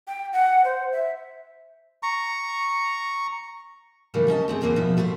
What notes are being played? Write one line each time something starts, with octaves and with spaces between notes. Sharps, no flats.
G5
F#5
C5
E5
A#5 C#6
C#3 E3 G3 A3 A#3
C#4 D#5 A5
A3 C4 G#4
E2 A2 E3 A#3 C4 C5
B2 F3 E4
G3 A3 G4 B4 C5